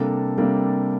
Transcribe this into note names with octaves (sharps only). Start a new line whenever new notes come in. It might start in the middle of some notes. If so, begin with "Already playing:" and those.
Already playing: C3 G3 A#3 D4 A4
C3 G3 A#3 D4 A4